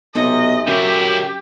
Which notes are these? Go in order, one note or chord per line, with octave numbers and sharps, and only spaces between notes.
B1 C3 A3 D#5 G#5
F#2 C#3 E4 G4